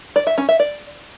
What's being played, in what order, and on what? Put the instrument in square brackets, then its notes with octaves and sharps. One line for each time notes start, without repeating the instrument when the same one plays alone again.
[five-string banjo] D5
E5
C#4
E5
D5